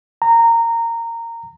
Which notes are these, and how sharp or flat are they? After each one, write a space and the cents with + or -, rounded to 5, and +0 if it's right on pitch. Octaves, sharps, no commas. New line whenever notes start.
A#5 -15